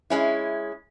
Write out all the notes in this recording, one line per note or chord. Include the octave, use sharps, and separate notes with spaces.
G#3 C#4 E4